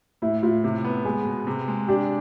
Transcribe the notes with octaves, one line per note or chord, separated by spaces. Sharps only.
A2 E4
A2 F4
C3 E4
B3
G#3 G#4
B2
C3
G#3
D4 G4